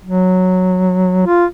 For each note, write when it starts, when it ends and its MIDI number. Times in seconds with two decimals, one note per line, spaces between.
0.04 1.24 54
1.26 1.46 65